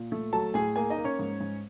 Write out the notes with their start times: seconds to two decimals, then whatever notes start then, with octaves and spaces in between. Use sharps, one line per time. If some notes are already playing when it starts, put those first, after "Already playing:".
Already playing: A#2
0.12 A3
0.33 F#3 A4 A5
0.54 A2 G#4 G#5
0.76 A#3 G#4 G#5
0.90 D#4 D#5
0.97 A#3
1.04 C#4 C#5
1.19 G#2
1.41 G#2